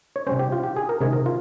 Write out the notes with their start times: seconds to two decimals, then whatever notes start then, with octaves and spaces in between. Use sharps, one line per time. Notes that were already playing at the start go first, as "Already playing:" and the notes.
0.16 C#5
0.27 C3 G3 C#4 C5
0.39 G4
0.52 F4
0.63 G4
0.76 G#4
0.89 A#4
1.01 C3 D#3 G#3 C#4 G#4
1.13 A#4
1.26 F4